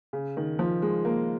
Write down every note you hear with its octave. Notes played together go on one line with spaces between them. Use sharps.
C#3
D#3
F3
G#3
A#3